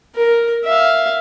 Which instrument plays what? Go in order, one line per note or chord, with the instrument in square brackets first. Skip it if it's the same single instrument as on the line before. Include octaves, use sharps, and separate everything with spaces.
[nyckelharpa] A#4
E5 F5